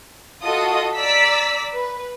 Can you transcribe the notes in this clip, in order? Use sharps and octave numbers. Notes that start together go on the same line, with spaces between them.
F4 F#4 A4 D#5 D#6
D5 A#5 E6 B6
B4